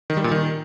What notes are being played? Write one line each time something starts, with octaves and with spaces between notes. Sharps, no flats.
D#3
G3
A#2
D#3